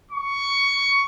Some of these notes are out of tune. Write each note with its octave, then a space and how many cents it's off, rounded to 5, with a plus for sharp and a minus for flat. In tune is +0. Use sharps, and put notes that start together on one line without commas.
C#6 +15